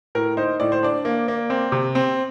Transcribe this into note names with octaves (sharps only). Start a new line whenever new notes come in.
A2 A#4
D#4 C5
A2 D5
C5
D4 D5
A#3
A#3
C4
C3
C4